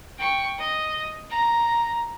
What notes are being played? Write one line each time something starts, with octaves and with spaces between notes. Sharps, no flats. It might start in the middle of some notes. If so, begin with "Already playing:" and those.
G5 C#6
D#5
A#5